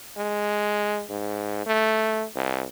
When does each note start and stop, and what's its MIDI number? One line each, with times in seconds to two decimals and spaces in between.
0.17 1.03 56
1.09 1.63 44
1.66 2.24 57
2.35 2.64 36